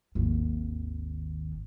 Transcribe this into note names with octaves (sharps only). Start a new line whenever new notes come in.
G#1 D#2